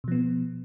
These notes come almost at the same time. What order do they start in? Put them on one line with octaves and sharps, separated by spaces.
B2 F3 B3